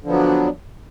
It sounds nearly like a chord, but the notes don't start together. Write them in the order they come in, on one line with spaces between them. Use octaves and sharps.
D3 F3 B3 F#3 D4